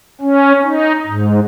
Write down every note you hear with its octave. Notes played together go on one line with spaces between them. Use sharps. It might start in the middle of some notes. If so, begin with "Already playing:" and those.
C#4
D#4
G#2